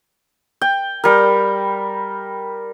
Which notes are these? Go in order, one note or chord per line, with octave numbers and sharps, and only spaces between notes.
G5
G3 A#4